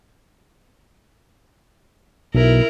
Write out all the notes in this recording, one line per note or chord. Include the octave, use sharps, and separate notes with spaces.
B1 E4 A#4